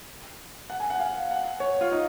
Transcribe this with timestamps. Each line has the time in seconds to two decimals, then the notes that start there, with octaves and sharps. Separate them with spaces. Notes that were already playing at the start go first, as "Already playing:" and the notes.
0.70 F#5
0.80 G#5
0.90 F#5
1.00 F5
1.31 F#5
1.60 C#5
1.81 F4
1.92 D#4